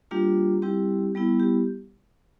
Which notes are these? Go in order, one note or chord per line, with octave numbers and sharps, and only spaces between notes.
G3 A#3 D4 F4 G4
G3 C4 E4 G4
G3 B3 E4
G4